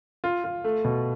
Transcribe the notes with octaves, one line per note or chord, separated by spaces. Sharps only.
F4
F4
A3
B2